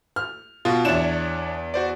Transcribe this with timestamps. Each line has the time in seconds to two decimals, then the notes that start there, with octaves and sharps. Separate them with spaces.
0.16 F6
0.65 B2 F4 F#4
0.85 E2 D4 E4 C#5 E7
1.74 F#4 C5 D5